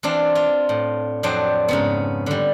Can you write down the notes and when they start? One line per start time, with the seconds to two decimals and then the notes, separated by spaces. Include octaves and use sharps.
0.03 E3 C4 D4 F4
0.35 F4
0.69 A2
1.23 F2 F#3 D4 C5 G5
1.68 G#2 C#3 B3
2.26 D3 G3